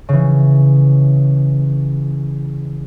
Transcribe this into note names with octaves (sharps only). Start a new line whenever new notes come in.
C#3 E3